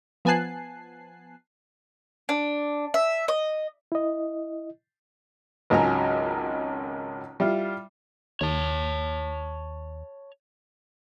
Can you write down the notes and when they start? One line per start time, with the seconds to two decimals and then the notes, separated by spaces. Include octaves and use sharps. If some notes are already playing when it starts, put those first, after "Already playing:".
0.25 F3 B3 G#5 A5 F#6 C7
2.29 D4
2.94 E5
3.28 D#5
3.92 E4 D#5
5.70 G#1 C#2 F#3 C#4 A#5
7.40 G3 E4 F4
8.41 D#2 C#5 A5